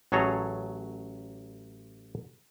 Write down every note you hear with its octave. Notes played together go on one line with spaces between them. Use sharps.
A1 F#3 G#4 A4 C#5 A#5